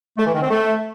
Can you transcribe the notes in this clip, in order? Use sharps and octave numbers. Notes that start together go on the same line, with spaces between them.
A3
E3
D#3
C4
A3